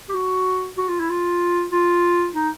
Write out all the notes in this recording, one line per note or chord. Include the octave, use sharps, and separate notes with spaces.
G4
F#4
F#4
F4
E4
F4
F4
D#4